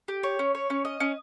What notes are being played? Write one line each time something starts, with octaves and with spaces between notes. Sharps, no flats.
G4
C#5
C#4
C#5
C#4
D#5
C#4